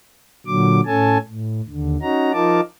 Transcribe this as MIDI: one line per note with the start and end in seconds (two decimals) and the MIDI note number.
0.47 0.81 46
0.47 0.81 50
0.47 0.81 54
0.47 0.81 86
0.86 1.18 45
0.86 1.18 61
0.86 1.18 69
0.86 1.18 80
0.86 1.18 81
1.29 1.61 45
1.69 1.97 39
1.69 1.97 50
2.02 2.32 61
2.02 2.32 63
2.02 2.32 66
2.02 2.32 82
2.33 2.61 53
2.33 2.61 63
2.33 2.61 65
2.33 2.61 70
2.33 2.61 81
2.33 2.61 86